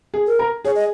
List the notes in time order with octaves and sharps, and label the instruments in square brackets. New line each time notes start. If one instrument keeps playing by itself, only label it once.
[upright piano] G#4
[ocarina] A#4
[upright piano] A#4
[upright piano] G#4 [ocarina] C#5
[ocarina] D#5